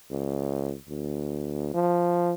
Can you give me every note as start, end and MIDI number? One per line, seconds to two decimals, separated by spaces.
0.11 0.75 37
0.89 1.70 38
1.74 2.34 53